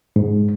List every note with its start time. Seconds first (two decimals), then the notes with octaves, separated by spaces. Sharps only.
0.16 G#2